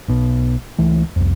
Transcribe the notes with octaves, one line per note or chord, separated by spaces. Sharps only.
B1 B2
C#2 E3 A3
C2 F2